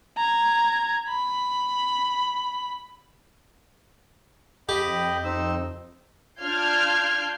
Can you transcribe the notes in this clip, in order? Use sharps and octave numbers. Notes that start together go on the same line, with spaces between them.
A#5 G#6
B5
F2 G4 D#5 G5 B5
C4 D#4 E6
D4 F4 F6 G6 G#6 C7